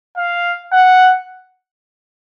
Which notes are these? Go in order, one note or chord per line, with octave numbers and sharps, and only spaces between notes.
F5
F#5